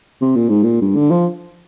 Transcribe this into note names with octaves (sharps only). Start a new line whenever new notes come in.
C3
A#2
G#2
A#2
G2
D3
F3